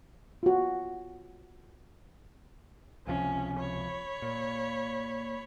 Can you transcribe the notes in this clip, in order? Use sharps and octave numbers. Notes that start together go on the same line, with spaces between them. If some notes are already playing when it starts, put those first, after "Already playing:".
F4 F#4
C#2 C3 F3 C#4
C#5 B5
A#2